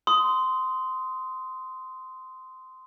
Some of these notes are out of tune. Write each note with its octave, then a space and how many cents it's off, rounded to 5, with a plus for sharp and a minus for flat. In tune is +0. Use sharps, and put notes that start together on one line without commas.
C6 -15 D#6 +10